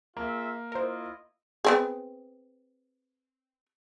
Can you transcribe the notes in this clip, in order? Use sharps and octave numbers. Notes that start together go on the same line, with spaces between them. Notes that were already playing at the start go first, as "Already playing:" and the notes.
A#3 F4 G#4 E5
E4 F4 A#4 C5 D#5
B3 C4 G#4